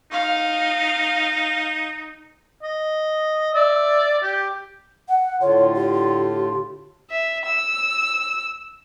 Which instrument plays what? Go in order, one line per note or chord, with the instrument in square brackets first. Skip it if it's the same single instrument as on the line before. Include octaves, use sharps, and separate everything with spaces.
[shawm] D#4 [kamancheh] F5
[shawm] D#5
[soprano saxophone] D5 [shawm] E5
[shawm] G4
[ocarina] F#5
[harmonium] A2 D3 F4 [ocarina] C#5
[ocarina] G4
[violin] E5
E6